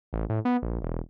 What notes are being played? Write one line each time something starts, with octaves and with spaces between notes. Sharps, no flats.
A1
A2
B3
A#1
E1